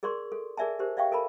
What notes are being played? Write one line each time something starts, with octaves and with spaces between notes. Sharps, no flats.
G#4 A#4 D5 C6 C#6
A4
G#4 A#4 D5 E5 G#5 A5
G4 A#4 C5
D5 E5 F5 G5 C#6
A4 A#4 A5 B5